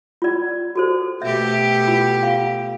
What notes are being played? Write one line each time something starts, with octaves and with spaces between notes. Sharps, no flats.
F4 D5
F#4 A4 C5
B2 A3 G4 E5
F4
F5